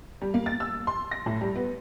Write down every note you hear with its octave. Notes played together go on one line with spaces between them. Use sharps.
G3
A#3
A6
E6
C6
A#6
A2
G3
B3